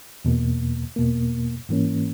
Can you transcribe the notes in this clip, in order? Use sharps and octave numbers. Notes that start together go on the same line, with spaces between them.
E2 B2 A#3
E2 B2 A#3
G#2 E3 A#3 C#4